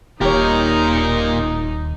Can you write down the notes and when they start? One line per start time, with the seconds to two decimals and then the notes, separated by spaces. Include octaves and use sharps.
0.21 D#1 A#2 D#4 G4 A#4 C#5